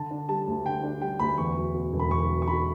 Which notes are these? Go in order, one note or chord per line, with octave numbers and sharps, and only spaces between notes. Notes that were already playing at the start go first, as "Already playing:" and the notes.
Already playing: D3 A5
D4
G3 A5
D2
D3 G5
D4
G3 G5
D2 B5
E2 C#6
F#3
B2
E1
B5
E2 C#6
F#3
C#6
B2 B5